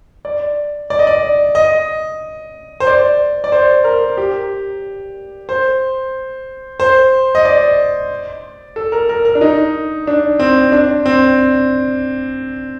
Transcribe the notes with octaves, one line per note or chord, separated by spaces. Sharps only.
D5
D5
D#5
D5
D#5
C5
D5
D5
C5
A#4
G4
C5
C5
D#5
D5
A4
A#4
A#4
A#4
D4
D#4
D4
C4
D4
C4